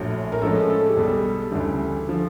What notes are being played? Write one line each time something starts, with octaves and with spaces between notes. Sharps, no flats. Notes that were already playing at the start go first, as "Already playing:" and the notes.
Already playing: A#1 A2 F#3
A#4
A2 F3 G#3 C#4 A4
A4
G4
B1 B2 G3 G#4
D2 C#3 E3 G3
D3 F3